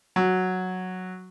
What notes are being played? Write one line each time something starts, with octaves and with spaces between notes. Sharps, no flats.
F#3